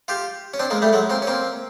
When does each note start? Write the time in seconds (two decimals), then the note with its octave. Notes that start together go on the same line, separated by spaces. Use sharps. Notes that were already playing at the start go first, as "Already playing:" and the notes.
0.08 F4 G4
0.54 C#4
0.59 C4 D4
0.70 G#3 A#3
0.82 G3 A3
0.93 F#3 G#3
1.10 A#3 C4
1.22 C#4
1.27 A#3 C4